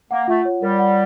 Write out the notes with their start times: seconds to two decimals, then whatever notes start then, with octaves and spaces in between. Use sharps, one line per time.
0.10 A#3 F#5
0.28 A3 F4
0.45 C#5
0.62 G3 A#4
0.79 F#5